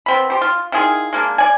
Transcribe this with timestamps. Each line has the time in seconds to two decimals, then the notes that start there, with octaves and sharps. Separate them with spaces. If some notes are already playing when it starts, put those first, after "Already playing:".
0.06 B3 C4 B5
0.30 G4 C5
0.41 F4
0.72 D#3 E4 F4 G#4
1.13 G#3 A#3 D4
1.38 D5 G#5